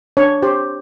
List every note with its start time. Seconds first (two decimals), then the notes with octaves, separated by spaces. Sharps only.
0.17 D4 C#5
0.43 G4 C5